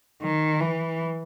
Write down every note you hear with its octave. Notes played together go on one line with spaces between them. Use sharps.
D#3
E3